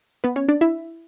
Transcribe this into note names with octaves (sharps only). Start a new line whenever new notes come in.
B3 B4
C#4 C#5
D4 D5
E4 E5